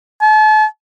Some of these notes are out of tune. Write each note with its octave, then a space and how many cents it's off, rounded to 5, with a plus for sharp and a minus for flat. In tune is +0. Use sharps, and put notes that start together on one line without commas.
A5 -40